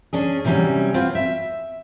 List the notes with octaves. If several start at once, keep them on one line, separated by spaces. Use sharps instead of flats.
C#4 D4 G#4
C3 E3 F#3 G3 C#4
C4 F4 F#4 B4
E5